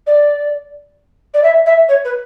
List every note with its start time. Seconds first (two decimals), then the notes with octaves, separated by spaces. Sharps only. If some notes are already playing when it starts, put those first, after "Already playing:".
0.07 D5
1.34 D5
1.43 E5
1.66 E5
1.89 C#5
2.05 B4